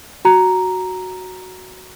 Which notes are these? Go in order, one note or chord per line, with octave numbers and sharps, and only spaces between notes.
F#4 A#5